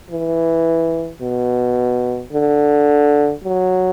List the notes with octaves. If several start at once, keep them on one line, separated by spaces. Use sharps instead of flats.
E3
B2
D3
F#3